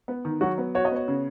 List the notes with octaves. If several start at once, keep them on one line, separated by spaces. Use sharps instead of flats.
B3
D#3
F#3 F#4
B3
F#4 C#5
D#5
B3 C#5
C#3